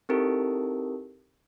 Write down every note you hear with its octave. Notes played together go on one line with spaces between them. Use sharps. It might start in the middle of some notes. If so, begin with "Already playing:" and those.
C4 D#4 E4 G4 A4 A#4